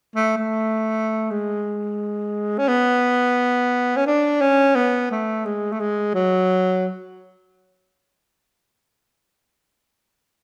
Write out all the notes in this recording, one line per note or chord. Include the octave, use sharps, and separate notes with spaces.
A3
A3
G#3
C#4
B3
C#4
D4
C#4
B3
A3
G#3
A3
G#3
F#3